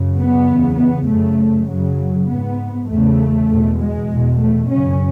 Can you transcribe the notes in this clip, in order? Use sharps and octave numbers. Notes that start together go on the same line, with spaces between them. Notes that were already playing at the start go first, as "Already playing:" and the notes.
Already playing: F#2 C#3
B3
E2 C#3
B3
F#2 C#3 A3
F#2 C#3 F#3
G#2 B3
E2 C#3 A3
E2 B2
G#3
E2 B2
A3
F#2 C#3 C#4